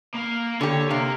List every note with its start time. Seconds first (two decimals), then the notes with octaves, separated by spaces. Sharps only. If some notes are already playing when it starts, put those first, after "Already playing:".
0.15 A#3 F5
0.61 D3 G4 C#5
0.91 C3 A#4 F5